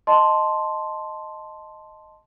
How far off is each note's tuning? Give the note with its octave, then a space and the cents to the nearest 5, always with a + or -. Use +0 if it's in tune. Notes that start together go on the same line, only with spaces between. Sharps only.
D#5 +0 A5 +0 C6 +0